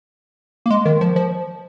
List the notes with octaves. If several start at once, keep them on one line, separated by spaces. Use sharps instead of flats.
A#3
G#3
D#3
F3
F3